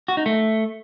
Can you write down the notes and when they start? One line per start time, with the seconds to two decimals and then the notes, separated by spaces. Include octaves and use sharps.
0.08 F#4
0.17 D#4
0.26 A3